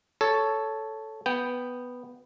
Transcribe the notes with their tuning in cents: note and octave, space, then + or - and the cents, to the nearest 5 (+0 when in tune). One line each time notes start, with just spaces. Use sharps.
A4 -5 C#5 +5
B3 +0 G5 +0